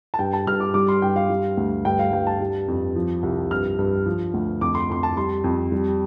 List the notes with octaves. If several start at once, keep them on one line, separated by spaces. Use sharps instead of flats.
A5
G2 G5
A5
G2 F6
D6
G3 D6
C6
G2 G5
F5
G3
D2
G2 G5
F5
G2 G5
A5
G3
F2
F3
C2
G2 F6
G2
F3
D2
F2 D6
C6
F2 C6
A5
G3 C6
F2
G3